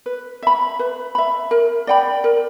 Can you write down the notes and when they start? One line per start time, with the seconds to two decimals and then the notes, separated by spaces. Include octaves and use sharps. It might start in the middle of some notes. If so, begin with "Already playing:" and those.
0.06 B4
0.43 E5 B5
0.79 B4
1.15 E5 B5
1.51 A#4
1.87 D5 G5 B5
2.24 A#4